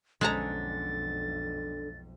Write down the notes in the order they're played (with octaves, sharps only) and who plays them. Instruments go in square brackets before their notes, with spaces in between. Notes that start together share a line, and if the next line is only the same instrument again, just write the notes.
[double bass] B1 F2 [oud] D3 C#4 [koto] G#3 A5 A#5 [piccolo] A6